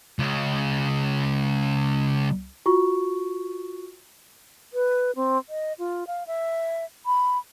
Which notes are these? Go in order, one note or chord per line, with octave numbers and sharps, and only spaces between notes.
C#2 C#3
F4 F#4 C#6
B4
C4
D#5
F4
F5
E5
B5